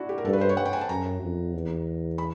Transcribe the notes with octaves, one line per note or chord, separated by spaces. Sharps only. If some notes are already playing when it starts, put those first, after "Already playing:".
Already playing: D4 E4 F#4
G4
A#4
G2 A4
B4
C5
C#5
F#5
G5
G#5
A5
F#2 A#5
F2
E2
B5